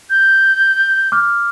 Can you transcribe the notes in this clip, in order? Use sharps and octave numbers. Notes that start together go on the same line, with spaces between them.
G6
D6 F6